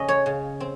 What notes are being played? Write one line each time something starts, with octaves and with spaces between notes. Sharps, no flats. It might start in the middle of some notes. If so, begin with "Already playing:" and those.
Already playing: C#3 C#4 D#5
C#5
C#3
C4